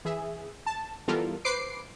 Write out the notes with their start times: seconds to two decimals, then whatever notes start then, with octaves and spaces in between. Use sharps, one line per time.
0.05 E3 G#4 E5
0.66 A5
1.08 E3 G3 B3 F4 A4 A#4
1.45 B4 C5 D6 C7 D7